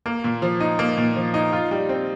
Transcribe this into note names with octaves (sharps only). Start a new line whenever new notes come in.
A#3
A#2
F3
D#4
A#3
A#2
F3
D#4
F4
G3
C4